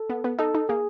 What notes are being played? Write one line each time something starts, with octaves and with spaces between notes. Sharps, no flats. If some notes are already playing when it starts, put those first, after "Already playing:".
Already playing: A4
B3
B3
D#4 A4
D#4
A#3 G#4